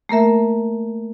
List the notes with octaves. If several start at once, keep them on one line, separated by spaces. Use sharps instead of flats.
A3 A#3 A#4 E5